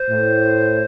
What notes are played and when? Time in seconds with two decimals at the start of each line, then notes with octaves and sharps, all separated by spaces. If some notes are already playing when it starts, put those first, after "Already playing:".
Already playing: C5
0.09 A2